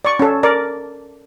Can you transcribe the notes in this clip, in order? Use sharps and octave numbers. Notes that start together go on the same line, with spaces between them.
D5 C#6
C#4 A4
A#4 D5